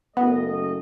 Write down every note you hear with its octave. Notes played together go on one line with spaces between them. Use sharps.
F#1 A3 B3 D#5